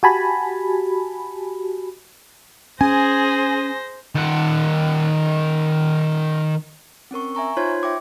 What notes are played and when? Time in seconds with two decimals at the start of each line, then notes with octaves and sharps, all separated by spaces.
0.03 F#4 G4 G#5 A5 B5
2.81 C#4 G#4 C5 G#5 A#6
4.15 D#3 F#5
7.11 C4 C#4 A#4 C#6
7.35 E5 G#5 A#5 C#6
7.57 D#4 F4 C5 C#5 C6 G#6
7.83 E5 G5 D6